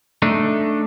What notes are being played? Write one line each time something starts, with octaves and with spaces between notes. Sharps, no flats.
A3 D4 D#4